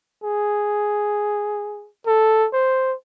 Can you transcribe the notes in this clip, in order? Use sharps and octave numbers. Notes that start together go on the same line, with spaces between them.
G#4
A4
C5